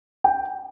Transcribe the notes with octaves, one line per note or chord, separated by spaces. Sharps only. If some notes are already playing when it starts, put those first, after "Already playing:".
G5